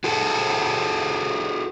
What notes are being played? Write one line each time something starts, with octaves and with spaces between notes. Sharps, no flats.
F#4 G#4 A4